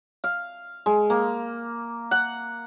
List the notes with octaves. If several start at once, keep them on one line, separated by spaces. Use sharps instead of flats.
F5
G#3
A#3
F#5